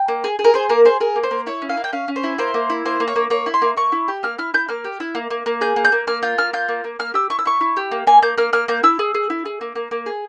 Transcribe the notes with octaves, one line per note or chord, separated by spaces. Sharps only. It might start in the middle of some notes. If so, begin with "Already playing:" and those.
Already playing: G5
A#3
G#4
G#4
A#4
G#4 C5
A#3 A#4
G#4 C5
G#4 A#4
A#3
C5
A#3
E4 C#5
C#4
F5
A#3
G5
C#4 F5
C#4
C5
E4
A#3 C5
A#3
E4
A#3 C5
A#3
C#5
A#3
A#3 C#5
E4
C6
A#3
A#3 C#6
E4
G4
A#3 F6
E4 F6
E4 G6
A#3 F6
G4
E4
A#3
A#3
A#3
G#4 G6
A#3
G6
A#3
A#3 F6
F4 G6
A#3 F6
F4 G6
A#3
A#3
A#3 F6
G4 E6
E4 C#6
E6
E4 C#6
E4
G4
A#3
A#3 G#5
A#3 G6
A#3 F6
A#3 F6
A#3 G6
E4 E6
G#4
G#4
E4
G#4
A#3
A#3
A#3
G#4